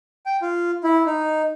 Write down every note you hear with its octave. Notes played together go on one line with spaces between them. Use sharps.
G5
F4
E4
D#4